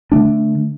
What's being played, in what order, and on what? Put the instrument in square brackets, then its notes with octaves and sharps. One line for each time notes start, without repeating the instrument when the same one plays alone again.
[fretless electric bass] D3 A3 D4